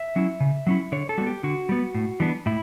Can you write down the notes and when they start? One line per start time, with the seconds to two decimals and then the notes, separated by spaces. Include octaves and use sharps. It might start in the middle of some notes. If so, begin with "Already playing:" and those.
Already playing: E5
0.16 F#3 C#4 E4
0.40 C#3
0.67 F#3 C#4 E4
0.92 D3 C#5
1.09 A4
1.18 G3 B3 F#4
1.27 G4
1.43 D3 F#4
1.69 G3 B3
1.94 A2
2.20 E3 G3 B3 D4
2.46 A2 E4